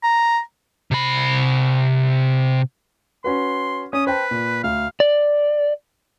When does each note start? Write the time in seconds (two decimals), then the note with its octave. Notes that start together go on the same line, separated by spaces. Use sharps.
0.03 A#5
0.91 C3 B5
3.24 C#4 F#4 B4 C6
3.93 C#4 D#6
4.07 B4 C5 G5 A5
4.31 A#2
4.64 D2 F5
5.00 D5